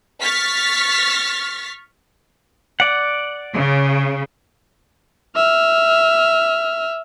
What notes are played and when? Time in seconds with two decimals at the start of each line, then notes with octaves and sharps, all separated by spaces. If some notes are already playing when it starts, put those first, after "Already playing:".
0.22 C#6 F6 A6 B6
2.80 D5 F#5
3.55 C#3
5.36 E5 F6